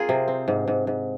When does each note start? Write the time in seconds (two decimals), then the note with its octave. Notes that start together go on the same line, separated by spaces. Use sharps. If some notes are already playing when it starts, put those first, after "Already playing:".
Already playing: C4 F4 G#4 A#4
0.09 C3
0.28 C4
0.48 G#2
0.68 G#2
0.87 G#2